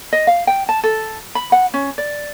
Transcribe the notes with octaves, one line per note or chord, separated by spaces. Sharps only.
D#5
F5
G5
A5
A4
B5
F#5
C#4
D5